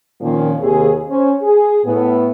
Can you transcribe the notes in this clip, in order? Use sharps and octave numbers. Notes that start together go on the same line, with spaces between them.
A#2 D#3 F3 A#3 C4 C#4
D#2 C3 G#4
C#4 C5
G#4
A2 B3